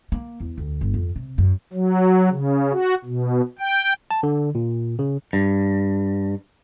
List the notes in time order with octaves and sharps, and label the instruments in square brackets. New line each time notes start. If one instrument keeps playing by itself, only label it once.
[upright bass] A#3
E2
D2
G1
F2
C3
F#2
[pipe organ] F#3
C#3
F#4
B2
G5
[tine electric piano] A5
D3
A#2
C#3
[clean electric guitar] G2